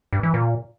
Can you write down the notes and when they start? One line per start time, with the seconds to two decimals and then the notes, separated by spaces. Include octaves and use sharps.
0.13 G2
0.23 E3
0.34 A#2